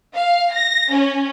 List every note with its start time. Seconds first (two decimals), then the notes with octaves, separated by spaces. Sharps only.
0.15 F5
0.53 A#6
0.92 C#4